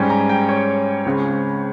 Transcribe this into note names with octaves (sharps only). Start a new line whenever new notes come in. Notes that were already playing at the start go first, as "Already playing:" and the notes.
Already playing: G#2 G3 C#4 G5
A#5
G5
C#5
C#2 C#3 G#3 C4